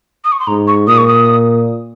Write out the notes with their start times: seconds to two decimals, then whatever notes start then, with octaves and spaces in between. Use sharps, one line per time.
0.25 D#6
0.32 C#6
0.40 C6
0.47 G#2 A#5
0.67 C#6
0.88 A#2 D#6
0.98 C#6
1.08 D#6